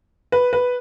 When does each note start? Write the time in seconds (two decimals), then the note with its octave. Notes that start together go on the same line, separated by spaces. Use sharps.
0.32 B4
0.53 B4